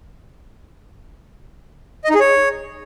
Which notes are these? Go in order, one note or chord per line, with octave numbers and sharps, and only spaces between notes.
D#5
D#4
G#4
C#5